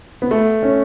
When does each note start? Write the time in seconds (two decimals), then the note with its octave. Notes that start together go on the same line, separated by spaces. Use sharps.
0.22 B3
0.31 A3
0.63 C#4